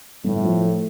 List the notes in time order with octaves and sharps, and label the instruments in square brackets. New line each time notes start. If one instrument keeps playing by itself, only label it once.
[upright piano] G1 [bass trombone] A2
[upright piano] F3
A3